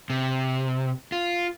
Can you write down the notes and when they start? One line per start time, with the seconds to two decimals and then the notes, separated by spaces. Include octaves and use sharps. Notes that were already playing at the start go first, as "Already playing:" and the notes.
0.10 C3
1.12 F4